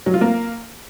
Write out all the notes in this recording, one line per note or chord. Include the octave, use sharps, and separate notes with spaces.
F#3
F4
A#3